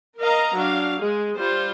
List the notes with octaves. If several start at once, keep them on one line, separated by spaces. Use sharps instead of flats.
A#4 D#5 F5 A#5
F#3 D4 F5
G#3 G#4
G3 F4 C5